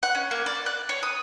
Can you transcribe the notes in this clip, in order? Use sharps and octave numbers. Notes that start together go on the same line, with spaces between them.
F#5
C#4
A#3
D5
F#6
C#5
D#6